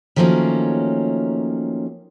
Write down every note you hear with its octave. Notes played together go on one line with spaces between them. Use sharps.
D#3 F3 F#3 A3 A#3 C#4